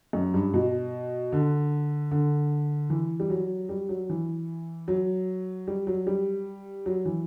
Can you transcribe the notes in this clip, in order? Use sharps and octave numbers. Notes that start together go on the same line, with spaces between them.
F#2
G2
B2
D3
D3
E3
G3
F#3
G3
F#3
E3
F#3
G3
F#3
G3
F#3
E3